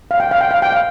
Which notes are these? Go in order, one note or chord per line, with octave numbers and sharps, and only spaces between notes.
F5
G5
F5
G5
F5
G5
F5